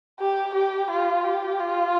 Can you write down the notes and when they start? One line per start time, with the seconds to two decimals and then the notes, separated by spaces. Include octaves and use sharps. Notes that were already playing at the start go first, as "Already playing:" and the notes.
0.20 G4
0.54 G4
0.90 F4
1.24 G4
1.59 F4